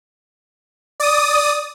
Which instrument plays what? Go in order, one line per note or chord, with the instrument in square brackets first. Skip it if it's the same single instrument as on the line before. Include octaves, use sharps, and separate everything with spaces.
[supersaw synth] D5 D#6